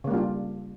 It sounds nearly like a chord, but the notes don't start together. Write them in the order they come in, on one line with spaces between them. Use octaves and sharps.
C#3 A#3 G3 F4 D4